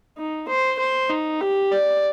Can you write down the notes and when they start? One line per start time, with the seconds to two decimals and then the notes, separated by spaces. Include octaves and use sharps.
0.18 D#4
0.48 C5
0.79 C5
1.10 D#4
1.41 G4
1.72 D5